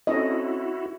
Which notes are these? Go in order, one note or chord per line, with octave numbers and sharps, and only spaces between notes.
C4 C#4 E4 F#4 A4 D#5